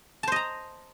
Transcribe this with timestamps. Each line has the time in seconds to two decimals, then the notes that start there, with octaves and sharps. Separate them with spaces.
0.23 A5
0.27 C5
0.32 D#5
0.36 A#5